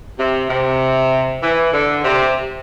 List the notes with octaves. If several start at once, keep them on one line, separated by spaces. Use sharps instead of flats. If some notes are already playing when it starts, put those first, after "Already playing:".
C3
C3
E3
D3
C3